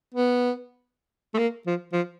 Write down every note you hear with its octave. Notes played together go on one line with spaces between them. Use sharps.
B3
A3
A#3
F3
F3